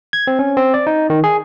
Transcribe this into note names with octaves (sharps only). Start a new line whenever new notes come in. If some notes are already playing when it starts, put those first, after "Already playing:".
G#6
C4
C#4
C4
D5
D#4
D#3
G#4